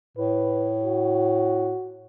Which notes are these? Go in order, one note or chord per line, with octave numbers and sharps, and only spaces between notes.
A2 B4
F#4